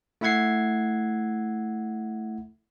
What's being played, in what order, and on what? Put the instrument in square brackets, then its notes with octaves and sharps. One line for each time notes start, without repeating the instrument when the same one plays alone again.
[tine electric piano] A3 E4 E5 F#5 G#6 C7